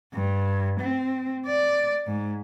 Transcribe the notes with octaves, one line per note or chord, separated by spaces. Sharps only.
G2
C4
D5
G#2